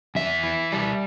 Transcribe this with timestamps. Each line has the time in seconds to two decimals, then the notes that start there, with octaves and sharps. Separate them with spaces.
0.15 E2 E5
0.43 E3
0.72 G3